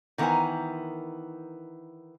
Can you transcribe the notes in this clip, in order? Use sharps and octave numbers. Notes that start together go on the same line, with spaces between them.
D#3 E3 B3 A#4 C5 G#5